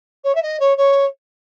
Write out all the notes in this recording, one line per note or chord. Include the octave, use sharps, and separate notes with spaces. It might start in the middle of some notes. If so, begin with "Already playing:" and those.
C#5
E5
D#5
C#5
C#5